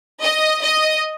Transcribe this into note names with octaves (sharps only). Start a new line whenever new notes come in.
D#5
D#5